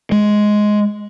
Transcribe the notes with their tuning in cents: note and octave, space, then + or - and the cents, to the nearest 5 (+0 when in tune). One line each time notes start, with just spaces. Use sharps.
G#3 +10